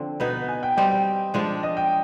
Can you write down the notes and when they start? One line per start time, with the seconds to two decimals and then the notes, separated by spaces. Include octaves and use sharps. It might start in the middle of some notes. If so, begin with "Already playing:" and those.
Already playing: D3 F3 C4
0.20 B2 B3 D#4 B4
0.48 G#5
0.63 G5
0.77 G3 C4 G4 D#5
0.91 G5
1.34 F3 G#3 D4
1.63 D#5
1.77 G5